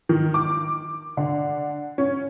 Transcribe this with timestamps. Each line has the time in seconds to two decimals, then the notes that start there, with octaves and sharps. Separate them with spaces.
0.09 D#3
0.34 D6
1.17 D3
1.98 C#4